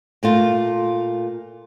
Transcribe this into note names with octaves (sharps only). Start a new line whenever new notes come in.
A#2 A3 F4